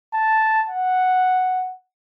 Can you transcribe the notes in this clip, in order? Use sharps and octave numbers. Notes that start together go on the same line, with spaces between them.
A5
F#5